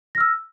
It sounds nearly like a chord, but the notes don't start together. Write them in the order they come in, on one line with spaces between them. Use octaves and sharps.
A#6 F6 E6